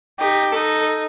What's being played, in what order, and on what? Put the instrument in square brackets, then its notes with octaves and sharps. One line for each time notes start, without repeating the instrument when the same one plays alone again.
[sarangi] D#4 [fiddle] G4
[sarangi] D#4 [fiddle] A4